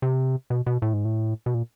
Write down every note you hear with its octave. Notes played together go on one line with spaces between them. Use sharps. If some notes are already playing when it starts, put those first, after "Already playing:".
C3
B2
B2
A2
G#2
A2
B2
A#2